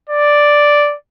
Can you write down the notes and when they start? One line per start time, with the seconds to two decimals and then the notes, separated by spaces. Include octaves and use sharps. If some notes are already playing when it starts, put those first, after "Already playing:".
0.09 D5